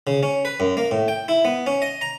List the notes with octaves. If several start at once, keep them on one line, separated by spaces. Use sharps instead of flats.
C#3
C#4
B4
F#2
A#3
A2
G5
E4
B3
C#4
D#5
A#5